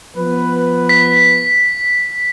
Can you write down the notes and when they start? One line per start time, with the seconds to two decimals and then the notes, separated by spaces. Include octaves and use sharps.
0.16 F3 B3 B4
0.89 B6